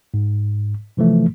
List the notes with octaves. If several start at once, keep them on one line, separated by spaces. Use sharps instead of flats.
G#2
C3 E3 F3 A3